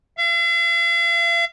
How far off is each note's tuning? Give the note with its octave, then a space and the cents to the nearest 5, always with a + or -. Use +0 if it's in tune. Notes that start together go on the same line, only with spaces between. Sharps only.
F5 -45